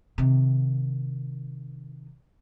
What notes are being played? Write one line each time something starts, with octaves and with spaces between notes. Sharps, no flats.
C3 D#3